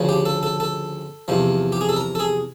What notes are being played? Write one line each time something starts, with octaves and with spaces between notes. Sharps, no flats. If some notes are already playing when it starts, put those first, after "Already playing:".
Already playing: D2 C#3 F3
G4
A4
A4
A4
E2 C3 F3
G4
G#4
A4
A#4
A4
G#4